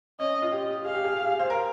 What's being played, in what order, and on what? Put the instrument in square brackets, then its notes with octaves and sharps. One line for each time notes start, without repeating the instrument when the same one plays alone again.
[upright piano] C#4 [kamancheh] D#5
[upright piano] F4
G4
[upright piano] G#4 [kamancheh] F5
[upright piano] G4
G#4
C5
A#4